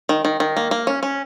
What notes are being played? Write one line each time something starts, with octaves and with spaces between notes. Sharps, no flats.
D#3
D#3
D#3
A#3
A#3
C#4
C#4